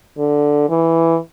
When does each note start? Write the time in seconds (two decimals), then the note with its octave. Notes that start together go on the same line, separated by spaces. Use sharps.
0.18 D3
0.70 E3